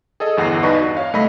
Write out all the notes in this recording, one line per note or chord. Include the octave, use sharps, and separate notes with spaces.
G#4 A4 D#5
G1 E2 F#5 A#6 C7
G2 D4 D#4 B4 D#5 C#6
F#4
C#5 F5
C2 A3 D#5 B5 A#6